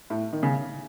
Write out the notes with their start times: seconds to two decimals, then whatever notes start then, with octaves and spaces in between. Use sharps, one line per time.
0.10 A2
0.33 D#3
0.43 C#3